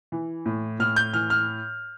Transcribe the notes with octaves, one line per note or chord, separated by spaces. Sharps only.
E3
A2
A2 F6
G6
E3 F6
F6